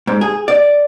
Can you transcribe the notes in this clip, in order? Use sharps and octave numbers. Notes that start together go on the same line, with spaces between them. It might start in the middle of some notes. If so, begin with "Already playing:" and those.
G#2
G#4
D5